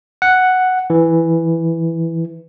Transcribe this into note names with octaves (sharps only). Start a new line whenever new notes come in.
F#5
E3